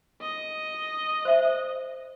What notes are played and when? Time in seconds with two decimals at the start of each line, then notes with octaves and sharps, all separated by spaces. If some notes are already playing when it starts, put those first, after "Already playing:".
0.22 D#5
1.25 C5 E5